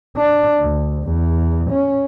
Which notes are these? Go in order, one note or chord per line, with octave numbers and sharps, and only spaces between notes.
D4
D2
E2
C#4